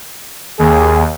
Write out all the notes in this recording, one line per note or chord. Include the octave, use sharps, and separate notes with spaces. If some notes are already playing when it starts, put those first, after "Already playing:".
D#2 G#4